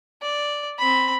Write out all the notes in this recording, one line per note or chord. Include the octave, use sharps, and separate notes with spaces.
D5
C4 B5